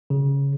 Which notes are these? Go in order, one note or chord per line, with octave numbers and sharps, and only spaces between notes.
C#3